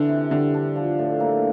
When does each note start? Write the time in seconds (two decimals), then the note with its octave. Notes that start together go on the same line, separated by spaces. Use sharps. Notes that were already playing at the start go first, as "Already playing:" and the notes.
Already playing: D3 E3
0.09 C3
0.31 D3 G3
0.54 D4
0.76 F3
0.99 A2
1.20 A#3